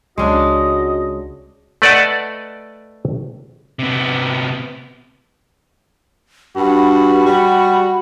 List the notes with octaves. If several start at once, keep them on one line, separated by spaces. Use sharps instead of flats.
C#2 G#3 C#4 D4 F#4 D#5
A3 B4 D5 D#5 F#5 A5
C3 B3
G2 F#4 B5
G3